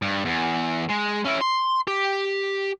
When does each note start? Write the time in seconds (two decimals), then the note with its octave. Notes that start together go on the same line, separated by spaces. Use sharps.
0.02 G2
0.25 E2
0.89 G#3
1.25 C#4 E4
1.41 C6
1.87 G4